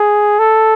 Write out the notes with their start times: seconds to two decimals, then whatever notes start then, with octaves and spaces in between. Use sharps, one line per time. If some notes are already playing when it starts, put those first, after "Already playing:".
Already playing: G#4
0.39 A4